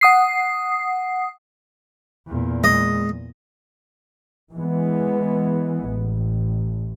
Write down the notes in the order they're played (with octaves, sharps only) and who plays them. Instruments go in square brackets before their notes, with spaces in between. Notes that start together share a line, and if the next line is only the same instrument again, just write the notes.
[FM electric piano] F#5 D#6 C7
[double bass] E2 A#2
[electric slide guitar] G#3 [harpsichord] D#5
[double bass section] E3 G#3 B3
A1